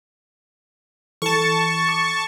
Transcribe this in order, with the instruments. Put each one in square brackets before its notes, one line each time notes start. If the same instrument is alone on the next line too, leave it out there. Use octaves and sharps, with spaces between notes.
[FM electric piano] E3 A4 [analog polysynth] A5 C#6
[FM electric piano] D6